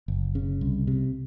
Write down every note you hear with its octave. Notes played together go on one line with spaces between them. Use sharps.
F#1
C#3
C2
C3